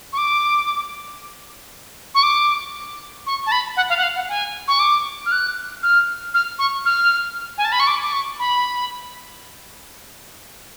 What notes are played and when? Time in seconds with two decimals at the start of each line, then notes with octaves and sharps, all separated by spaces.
0.13 C#6
0.18 D6
2.15 C#6
2.23 D6
3.27 C#6
3.47 A5
3.52 B5
3.77 F#5
3.90 F5
3.97 F#5
4.03 F5
4.15 F#5
4.29 G#5
4.68 C#6
4.80 D6
5.26 F6
5.32 F#6
5.83 F6
6.34 F6
6.59 C#6
6.86 F6
7.58 G#5
7.65 A5
7.72 B5
7.80 C#6
7.87 D6
8.02 D6
8.13 C#6
8.39 B5